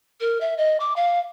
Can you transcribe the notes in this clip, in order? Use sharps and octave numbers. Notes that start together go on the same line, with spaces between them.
A#4
E5
D#5
D6
F5